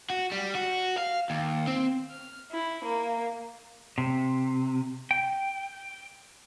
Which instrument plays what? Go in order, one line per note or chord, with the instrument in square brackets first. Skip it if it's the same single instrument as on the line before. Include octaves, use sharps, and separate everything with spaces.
[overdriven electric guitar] F#4
G3
F#4
F5
D#2
C4
[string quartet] F6
E4
A#3
[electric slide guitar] C3
G5